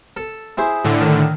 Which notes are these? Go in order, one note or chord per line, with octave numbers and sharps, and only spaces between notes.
A4
E4 G#4 C5
A2 D3
D#3